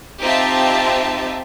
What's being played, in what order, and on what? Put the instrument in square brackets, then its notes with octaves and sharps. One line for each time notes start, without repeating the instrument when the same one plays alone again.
[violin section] C4 D#4 F4 G4 E5 A5